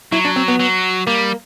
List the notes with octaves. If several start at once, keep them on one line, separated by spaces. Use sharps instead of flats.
F#3 E4
D4
C4
B3
F#3
G3 A#3